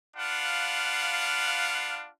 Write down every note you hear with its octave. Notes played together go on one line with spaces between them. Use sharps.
D4 F4 B4 F5 F#5